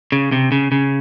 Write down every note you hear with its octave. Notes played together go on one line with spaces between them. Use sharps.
C#3
C3
C#3
C#3